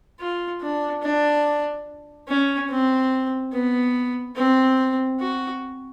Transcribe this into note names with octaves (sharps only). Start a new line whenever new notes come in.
F4
D4
D4
C#4
C4
B3
C4
F#4